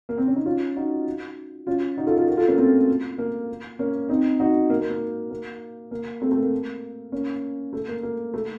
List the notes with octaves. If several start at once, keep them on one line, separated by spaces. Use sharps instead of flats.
A#3
C4
C#4
D#4
C#4 F4
D#4 F#4
C#4 F4
D#4 F#4
F4 A4
F4 A4
F#4 A#4
F4 A4
A#3 C#4
A3 C4
A#3
A#3 C#4
C4 D#4
D#4 F#4
A#3
A#3
A#3
A#3
A#3
A3 C4
A3
A#3
A#3 C#4
A3
A#3
A#3
A3